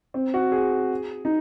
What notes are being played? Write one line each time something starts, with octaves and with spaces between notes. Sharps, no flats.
C4
F#4
G#4
D#4